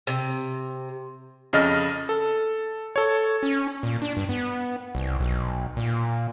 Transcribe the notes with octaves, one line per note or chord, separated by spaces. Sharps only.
C3
F2 C#3 D#5 F6 A6
A4
A4 C#5
C#4
A#2
D4
G2
B3
C2
B1
A#2